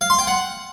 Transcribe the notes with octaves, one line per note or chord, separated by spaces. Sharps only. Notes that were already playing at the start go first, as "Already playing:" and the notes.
F5
C6
G5
F#5